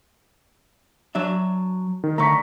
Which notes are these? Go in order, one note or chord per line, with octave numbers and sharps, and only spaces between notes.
F#3 D4 E5
D#3
D3 A3 A#5 C#6 B6